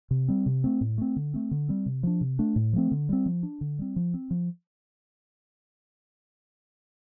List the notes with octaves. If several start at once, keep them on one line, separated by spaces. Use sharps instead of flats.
C3
G3 C4
C3
A3 C4
A2
A3 C4
D3
A3 C4
D3
G3 C4
C3
F3 D4
C3
A3 D4
A2
F3 A3 C4
D3
G3 C4
F3
D4
D3
G3 C4
F3
C4
F3